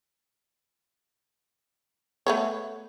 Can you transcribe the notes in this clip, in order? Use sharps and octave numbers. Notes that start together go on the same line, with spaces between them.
A3 B3 C#5